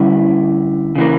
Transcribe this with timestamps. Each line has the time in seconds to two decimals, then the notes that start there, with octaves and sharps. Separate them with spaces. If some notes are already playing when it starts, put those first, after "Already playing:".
Already playing: D3 G3 C#4 E4
0.95 C#3 E3 A#3